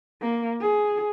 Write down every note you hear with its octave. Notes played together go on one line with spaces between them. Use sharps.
A#3
G#4